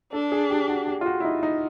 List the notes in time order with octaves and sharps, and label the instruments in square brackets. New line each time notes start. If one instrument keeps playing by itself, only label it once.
[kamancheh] D4 [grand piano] A4
[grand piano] G#4
G4
F#4
G4
F4
F#4
E4
D#4
D#4